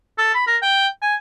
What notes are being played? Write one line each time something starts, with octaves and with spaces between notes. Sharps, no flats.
A4
B5
A#4
G5
G#5